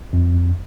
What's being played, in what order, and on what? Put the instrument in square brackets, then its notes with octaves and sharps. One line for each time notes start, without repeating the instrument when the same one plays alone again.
[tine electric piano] F2